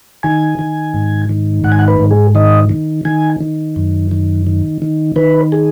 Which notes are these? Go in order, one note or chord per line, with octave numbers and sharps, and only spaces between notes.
D#3 G#5
D#3
G#2
D#3
G#2 F#5
G#5
F#5
B4
G#2
G#4
D#3 D#5
D#3
D#3 G#5
D#3
F#2
D#3
D#3
D#3
D#3 B4
G#4